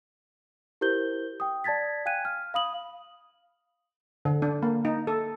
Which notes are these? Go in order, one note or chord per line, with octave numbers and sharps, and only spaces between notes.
E4 G4 A#4 C5 G6 G7
G5 D#6
D5 A5 G#6 A6 B6
F5 G5 G#5 F#6 G#6 D#7
F6
F5 B5 D#6 F#7
D3
D4
A#3
D#4
A4